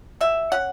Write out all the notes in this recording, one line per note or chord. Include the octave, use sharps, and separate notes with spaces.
B2 E5
C#4 F#5